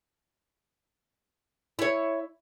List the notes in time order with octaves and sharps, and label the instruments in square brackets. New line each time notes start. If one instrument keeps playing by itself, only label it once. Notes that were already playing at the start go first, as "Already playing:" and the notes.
[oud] E4 C#5